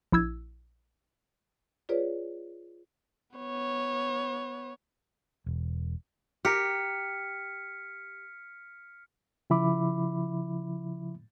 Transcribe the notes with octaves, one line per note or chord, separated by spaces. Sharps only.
A#1 E4 E6 G#6
F4 G#4 B4 C#5 D5
B3 C#5
E1
G4 A#4 F6 B6 C#7
C#3 F3 E4 E5 B5 D6